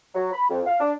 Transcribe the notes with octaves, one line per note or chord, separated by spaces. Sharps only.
F#3
B5
F2
F5
D4